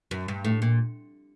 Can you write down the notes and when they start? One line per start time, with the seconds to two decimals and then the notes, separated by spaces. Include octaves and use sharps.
0.11 F#2
0.28 G2
0.45 A2
0.62 A#2